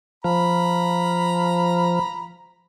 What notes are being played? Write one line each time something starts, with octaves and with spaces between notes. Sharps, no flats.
F3 A#5 B5